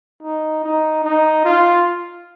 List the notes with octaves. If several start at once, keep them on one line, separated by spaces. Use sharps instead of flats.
D#4
D#4
D#4
F4